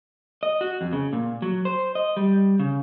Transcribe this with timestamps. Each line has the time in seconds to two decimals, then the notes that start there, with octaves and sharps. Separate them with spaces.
0.43 D#5
0.61 F#4
0.81 F2
0.93 C#3
1.13 A#2
1.42 F#3
1.65 C5
1.95 D#5
2.17 G3
2.59 C#3